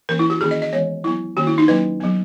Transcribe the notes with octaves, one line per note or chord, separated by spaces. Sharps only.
E3 A#3 C#4 A#4
E4
F#4
D#3 A#3 C#4 G#4
D#5
D#5
E3 G#3 B3 C#5
F#3 B3 E4
D#3 A#3 C#4 F#4
E4
D#4
F#3 A#3 C#4 B4
F#3 B3